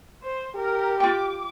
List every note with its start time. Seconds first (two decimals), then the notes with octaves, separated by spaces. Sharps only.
0.23 C5
0.55 G4 A#4
1.00 F4 G5 D6